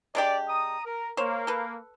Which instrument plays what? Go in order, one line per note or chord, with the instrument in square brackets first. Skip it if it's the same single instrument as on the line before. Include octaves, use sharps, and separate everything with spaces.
[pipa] G#3 D4 G4 [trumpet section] D5
[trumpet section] A#5 D#6
A#4
[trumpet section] A#3 [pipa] C5 C#5
[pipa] A4 B4